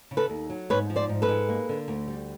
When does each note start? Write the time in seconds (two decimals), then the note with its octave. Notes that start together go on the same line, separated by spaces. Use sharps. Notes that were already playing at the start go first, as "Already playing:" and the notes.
0.11 C#3
0.17 A4 B4
0.30 D#2
0.50 F#3
0.70 G#2 B4 C#5
0.90 F3
0.96 C5 D5
1.09 G#2
1.22 A4 B4
1.29 G#3
1.49 A#3
1.69 D3
1.88 D2
2.08 G3